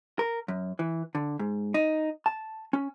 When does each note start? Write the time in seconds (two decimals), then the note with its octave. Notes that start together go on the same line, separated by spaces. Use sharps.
0.19 A#4
0.48 F#2
0.79 E3
1.15 D3
1.39 G#2
1.74 D#4
2.26 A5
2.73 C#4